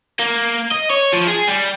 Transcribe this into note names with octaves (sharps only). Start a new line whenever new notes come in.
A#3
D#5
C#5
F3
G#4
G3